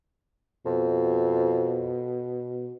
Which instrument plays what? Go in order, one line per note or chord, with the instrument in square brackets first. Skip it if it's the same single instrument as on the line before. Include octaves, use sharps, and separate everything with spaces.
[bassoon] F2 [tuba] B2